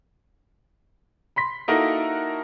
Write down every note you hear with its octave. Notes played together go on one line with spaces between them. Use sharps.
B5 C6 B6
A#3 D#4 E4 F#4 A4 A#4